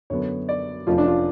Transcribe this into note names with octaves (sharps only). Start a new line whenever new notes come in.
F#2 D3 F#3 B3 C#5
D5
F1 F2 F3 A3 C#4 F4
D4
F4